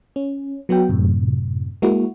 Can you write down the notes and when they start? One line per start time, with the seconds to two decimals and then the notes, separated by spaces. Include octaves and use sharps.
0.16 C#4
0.69 F#3 B3 F#4 G5
0.89 F#2 A2 C3
1.82 G#3 A#3 E4 F#4